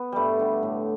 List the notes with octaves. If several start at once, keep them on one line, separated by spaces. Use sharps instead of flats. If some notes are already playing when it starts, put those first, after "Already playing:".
Already playing: B3
G2 G3 A3
D3 G3
A2